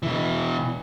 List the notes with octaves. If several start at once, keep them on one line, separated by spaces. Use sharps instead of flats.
B2 E3